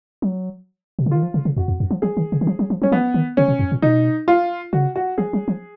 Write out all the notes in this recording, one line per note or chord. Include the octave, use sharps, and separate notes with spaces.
F#3
B2
C#3
D#3 F4
F3
C#3
C#3
F2 F#4
F2
F#2
F3
F3 G#4
D#3
C#3
D#3
F3
F#3
F3
F#3 C#4
F3 B3
D#3
C#3 C#4
B2
F#2
A#2
B2 D#4
F4
C#3 F#4
F#4
F3 G#4
F#3
F3